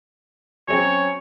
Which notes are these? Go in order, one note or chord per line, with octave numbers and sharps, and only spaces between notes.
F#3 C4 C#4 C#5